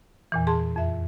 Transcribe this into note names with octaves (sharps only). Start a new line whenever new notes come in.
E2 A#2 E3
G#4 A5 C6
F2 E5